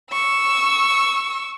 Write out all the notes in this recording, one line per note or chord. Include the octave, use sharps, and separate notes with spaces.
C#6 E6